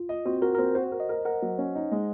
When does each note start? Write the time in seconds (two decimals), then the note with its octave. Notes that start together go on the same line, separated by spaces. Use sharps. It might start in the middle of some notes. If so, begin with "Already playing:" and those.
Already playing: F4
0.09 D#5
0.26 C4 F#4
0.42 F#4 A#4
0.55 A#4
0.58 C4 C5
0.75 F#4 C5
0.92 A#4
1.00 D#5
1.09 A#4
1.25 A#4 F#5
1.42 F#3
1.58 C#4
1.75 D#4
1.92 G#3